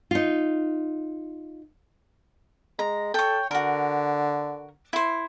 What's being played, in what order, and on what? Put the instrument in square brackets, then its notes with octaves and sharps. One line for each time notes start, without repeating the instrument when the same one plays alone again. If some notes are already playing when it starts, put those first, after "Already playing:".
[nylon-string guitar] D#4 F4
[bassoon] G#3 [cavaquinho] A#5
[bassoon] A4 [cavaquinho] C#5 G5
[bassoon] D3 [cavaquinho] F#4 A#4
[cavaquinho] E4 C5